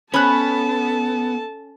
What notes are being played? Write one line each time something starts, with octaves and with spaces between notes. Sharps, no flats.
B3 C#4 A4 A5 B5 F#6